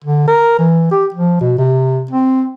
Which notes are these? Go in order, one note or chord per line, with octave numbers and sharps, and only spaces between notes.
D3
A#4
E3
G4
F3
B2
C3
C4